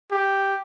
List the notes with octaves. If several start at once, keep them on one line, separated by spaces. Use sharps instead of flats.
G4